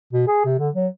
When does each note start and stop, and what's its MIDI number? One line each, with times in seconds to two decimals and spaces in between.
0.13 0.25 47
0.27 0.44 68
0.45 0.54 48
0.59 0.69 50
0.75 0.87 54